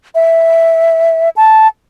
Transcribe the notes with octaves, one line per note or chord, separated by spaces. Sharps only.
E5
A5